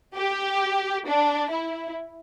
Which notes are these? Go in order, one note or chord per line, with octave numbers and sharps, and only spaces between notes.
G4
D4
E4